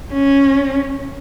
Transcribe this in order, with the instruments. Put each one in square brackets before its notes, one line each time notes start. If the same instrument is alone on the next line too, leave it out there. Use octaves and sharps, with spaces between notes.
[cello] C#4